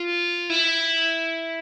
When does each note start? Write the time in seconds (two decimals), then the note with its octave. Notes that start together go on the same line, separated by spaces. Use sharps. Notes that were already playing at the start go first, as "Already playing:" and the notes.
Already playing: F4
0.50 E4